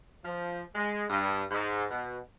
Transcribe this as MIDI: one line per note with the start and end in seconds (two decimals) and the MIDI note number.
0.25 0.62 53
0.75 1.05 56
1.10 1.43 43
1.51 1.85 44
1.91 2.18 47